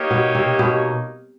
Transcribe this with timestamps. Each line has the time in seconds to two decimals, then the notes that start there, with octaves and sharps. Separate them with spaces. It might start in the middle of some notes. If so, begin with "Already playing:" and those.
Already playing: A#3 D#4 G4 A#4 C#5
0.11 B2
0.35 C3
0.59 B2